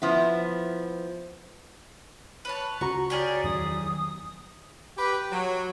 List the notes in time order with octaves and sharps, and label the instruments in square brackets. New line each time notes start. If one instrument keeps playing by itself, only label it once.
[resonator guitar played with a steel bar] F3 B3 E4
[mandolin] B4 C#5 A5
[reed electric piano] C#2 F#4 A#5 [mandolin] C#6
[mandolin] G4 G#4 A#4 [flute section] C#5 D5
[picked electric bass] E2 D#3 F#3 [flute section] D#6
[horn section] G4 B4
F#3